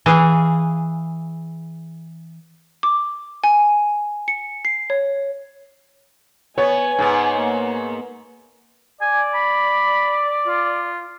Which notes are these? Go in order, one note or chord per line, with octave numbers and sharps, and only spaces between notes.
E3 G#4 F5
D6
G#5
C#7
C7
C#5
B3 C#5 G#5
G#2 B3
A#3
D5 G#5
B5
F4